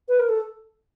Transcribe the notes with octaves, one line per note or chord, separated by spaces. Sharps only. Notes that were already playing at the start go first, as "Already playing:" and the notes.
B4
A#4
A4